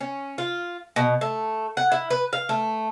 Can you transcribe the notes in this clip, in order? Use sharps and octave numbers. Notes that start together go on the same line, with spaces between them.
C#4
F4
B2
A3
F#5
E4
B4
F5
A3